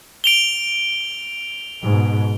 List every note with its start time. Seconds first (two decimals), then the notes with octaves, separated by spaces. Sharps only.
0.24 D7 F7 G7
1.84 G#2 B2